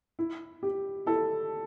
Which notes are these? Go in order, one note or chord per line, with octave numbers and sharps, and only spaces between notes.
E4
G4
E4 A4